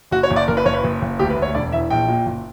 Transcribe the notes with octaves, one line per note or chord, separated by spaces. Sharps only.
F#1 F#4
C#5
F#1
D5
F#1 A#4
B4
F#1 C#5
B4
F#1
F#1
D2 G4
B4
D2
C#5
E1 D5
E3 E5
A#1 G5
A#2
F#1